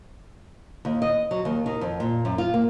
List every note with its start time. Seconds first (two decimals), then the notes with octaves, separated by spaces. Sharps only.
0.85 D#2
1.02 D#5
1.31 F#3
1.45 D#2
1.66 D#3
1.81 F2
2.00 A#2
2.25 F#2
2.38 F4
2.54 A#3